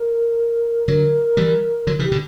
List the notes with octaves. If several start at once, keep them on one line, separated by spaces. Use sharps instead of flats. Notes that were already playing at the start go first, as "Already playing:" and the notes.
Already playing: A#4
D3 F#3 A#4
E3 G3
D3 F#3
C#3 E3
G4
B2 D3